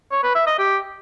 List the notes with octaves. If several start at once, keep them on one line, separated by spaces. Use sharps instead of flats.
C#5
B4
E5
D#5
G4